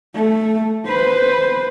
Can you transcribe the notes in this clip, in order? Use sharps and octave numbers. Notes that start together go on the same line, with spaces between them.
A3
B4 C5